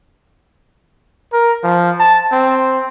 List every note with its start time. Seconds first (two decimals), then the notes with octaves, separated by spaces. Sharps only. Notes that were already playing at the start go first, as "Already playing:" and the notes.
1.33 A#4
1.63 F3
2.00 A5
2.32 C4